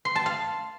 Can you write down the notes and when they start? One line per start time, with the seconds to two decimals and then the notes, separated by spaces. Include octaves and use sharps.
0.05 C6
0.16 A5
0.26 F5